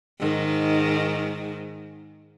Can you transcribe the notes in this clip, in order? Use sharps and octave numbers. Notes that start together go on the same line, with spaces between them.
G#2 D#3